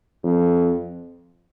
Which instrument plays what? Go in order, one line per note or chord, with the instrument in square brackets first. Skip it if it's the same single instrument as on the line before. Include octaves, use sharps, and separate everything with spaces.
[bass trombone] F2